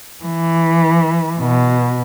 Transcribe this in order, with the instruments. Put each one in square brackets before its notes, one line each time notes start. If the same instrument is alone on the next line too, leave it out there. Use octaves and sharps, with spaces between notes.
[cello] E3
B2